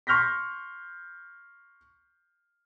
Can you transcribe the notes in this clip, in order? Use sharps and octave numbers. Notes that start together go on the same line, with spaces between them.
C6 C#6 F6 G6 A#6 B6